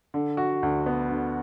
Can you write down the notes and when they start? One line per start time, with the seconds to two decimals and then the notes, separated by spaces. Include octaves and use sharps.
0.14 D3
0.37 F#4
0.63 D2
0.86 B3
1.10 D3